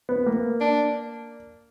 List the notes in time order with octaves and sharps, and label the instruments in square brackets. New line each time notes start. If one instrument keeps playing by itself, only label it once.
[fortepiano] B3
A#3
[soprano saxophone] D4